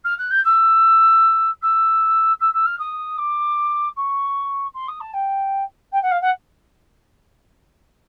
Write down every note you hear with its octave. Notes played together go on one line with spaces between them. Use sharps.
F6
F#6
G6
E6
E6
E6
E6
F6
D#6
D6
C#6
C6
D#6
A5
G5
G5
F#5
F5
F#5